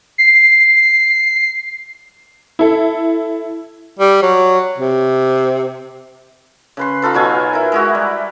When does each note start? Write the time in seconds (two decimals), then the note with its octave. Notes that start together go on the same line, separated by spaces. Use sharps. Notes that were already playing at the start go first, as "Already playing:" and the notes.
0.18 C7
2.59 E4 A4
3.99 G3
4.22 F#3
4.78 C3
6.77 C#3 B4 C6
7.02 D#4 F4 A4 B4
7.14 B2 F#3 F4 G#5
7.53 E4 A#4
7.72 G#3 E4 F#4
7.95 G3